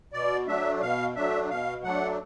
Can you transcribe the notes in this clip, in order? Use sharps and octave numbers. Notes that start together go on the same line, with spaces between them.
B2 D5
F#3 A3 D4 E5
B2 F5
F#3 A3 D4 E5
B2 F5
F#3 A3 D4 F#5